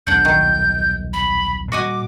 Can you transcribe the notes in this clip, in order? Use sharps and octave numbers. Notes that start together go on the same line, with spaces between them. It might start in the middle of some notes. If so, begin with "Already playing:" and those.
D#1 B1 D4 F#5 G6
D#3
B5
A#2 G3 F#4 D#5 G#5 D6